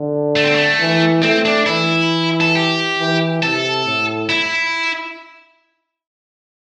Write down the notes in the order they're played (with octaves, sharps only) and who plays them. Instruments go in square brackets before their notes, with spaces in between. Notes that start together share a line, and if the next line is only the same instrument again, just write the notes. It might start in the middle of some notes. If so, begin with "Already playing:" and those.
Already playing: [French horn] D3
[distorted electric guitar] A3
C4
A3
[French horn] E3
[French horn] A3 [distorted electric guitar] C4
[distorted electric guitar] D4
[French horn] E3 [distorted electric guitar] E4
[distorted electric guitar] A4
G4
[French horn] E3
[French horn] C3 [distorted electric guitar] A4
[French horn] A2
[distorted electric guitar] E4